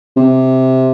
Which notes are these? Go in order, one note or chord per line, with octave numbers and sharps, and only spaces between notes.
C3